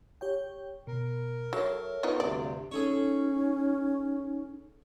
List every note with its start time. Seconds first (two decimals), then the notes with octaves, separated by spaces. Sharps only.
0.21 G4 C#5 G5
0.87 B2 A#4
1.53 F#3 A4 C#5 E5
2.03 B3 D#4 F4
2.20 D2 G2 C3 D5
2.72 C#4 D#4 G#4 A4 C#5